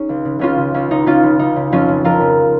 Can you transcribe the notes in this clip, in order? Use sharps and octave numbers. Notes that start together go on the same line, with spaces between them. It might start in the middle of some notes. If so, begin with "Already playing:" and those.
Already playing: C#4 D#4 G#4
C#2
C#3
C#2 C#4 F4
C#3
C#2 C#4
C#3 D#4
C#2 C#4 F4
C#3
C#2 D#4
C#3
F2 C#4 F4
C#3
F2 F4 A#4
C#3